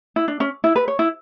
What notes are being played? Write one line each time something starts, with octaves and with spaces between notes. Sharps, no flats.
E4
D4
C#4
E4
B4
C#5
E4